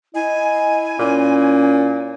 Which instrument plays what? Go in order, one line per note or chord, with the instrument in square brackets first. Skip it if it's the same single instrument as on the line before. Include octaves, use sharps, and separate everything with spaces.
[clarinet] E4 [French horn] D#5 [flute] G#5
[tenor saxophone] A#2 [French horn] C#4